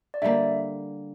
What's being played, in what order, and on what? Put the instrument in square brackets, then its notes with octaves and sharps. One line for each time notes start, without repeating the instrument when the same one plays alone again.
[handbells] D5
[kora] D3 G3 A#3 [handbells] E5